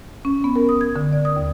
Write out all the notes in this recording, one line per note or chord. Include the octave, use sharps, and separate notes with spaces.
C#4
B3
A#4
D#6
G#6
D3
D5
D#6
D#2